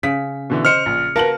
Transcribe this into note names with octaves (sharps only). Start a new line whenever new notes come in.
C#3 B6
B2 D3 E3
C5 D#5 F6 C#7
A#1
A#3 F#4 A#4 B4 A5 F#7